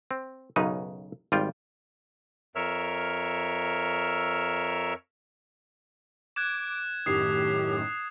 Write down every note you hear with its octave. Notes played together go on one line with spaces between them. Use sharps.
C4
B1 F#2 C#3 D#4 B4
G#1 G3 F4 G5
F2 A#4 C#5 E5 E6 F6
D6 F#6 G#6 E7
F#2 A2 D#3 G4 D#6 C7